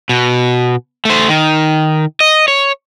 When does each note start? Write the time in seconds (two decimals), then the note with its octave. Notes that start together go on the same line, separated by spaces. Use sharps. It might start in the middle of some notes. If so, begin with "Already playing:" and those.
0.09 B2
1.05 A3 C5
1.29 D#3
2.20 D#5
2.48 C#5